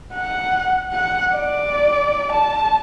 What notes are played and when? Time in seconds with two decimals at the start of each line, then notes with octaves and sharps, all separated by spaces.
0.14 F#5
0.93 F#5
1.35 D5
2.32 A5